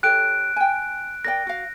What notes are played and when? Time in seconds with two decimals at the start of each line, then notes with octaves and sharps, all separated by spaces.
0.03 G4 A4 C#5 F#6 D7
0.56 G5 G#5
1.25 A#4 D5 G5 A#6
1.47 F#4 F5